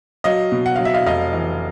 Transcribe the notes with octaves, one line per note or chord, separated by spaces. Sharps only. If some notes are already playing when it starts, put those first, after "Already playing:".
F#3 D#5 F5
B2
F#5
F#3 F5
E5
D#5 F5
F1 D#5 F5
E3